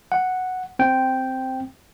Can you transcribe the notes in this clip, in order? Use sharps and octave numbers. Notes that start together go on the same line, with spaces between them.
F#5
C4 G5